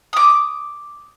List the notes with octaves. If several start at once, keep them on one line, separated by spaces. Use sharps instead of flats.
D6 D#6